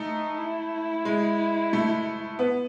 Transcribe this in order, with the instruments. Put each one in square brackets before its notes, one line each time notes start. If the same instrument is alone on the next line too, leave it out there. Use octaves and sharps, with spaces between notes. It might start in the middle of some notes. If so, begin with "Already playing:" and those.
Already playing: [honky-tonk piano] A3 [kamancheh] D#4
[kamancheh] E4
[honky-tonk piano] G#3
A3
B3